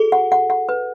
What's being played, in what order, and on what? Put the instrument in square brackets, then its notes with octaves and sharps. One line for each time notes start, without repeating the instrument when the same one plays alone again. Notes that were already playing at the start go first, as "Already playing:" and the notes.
Already playing: [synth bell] F#4 A4 [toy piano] G#4
[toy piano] F#5
F#5
F#5
B4